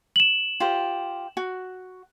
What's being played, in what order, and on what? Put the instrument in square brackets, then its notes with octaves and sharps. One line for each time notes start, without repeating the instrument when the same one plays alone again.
[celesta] E7 F#7
[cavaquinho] F4 G4 C5
F#4